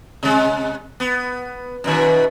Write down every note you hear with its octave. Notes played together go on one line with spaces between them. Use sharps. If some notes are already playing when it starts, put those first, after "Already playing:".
C3 G#3
B3
F#2 B2 D#3